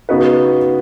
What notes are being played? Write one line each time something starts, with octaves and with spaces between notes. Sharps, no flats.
C#3 B3 D#4 F#4 B4